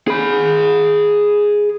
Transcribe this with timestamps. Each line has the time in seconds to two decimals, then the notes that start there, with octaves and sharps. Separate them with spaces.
0.08 G#4 B5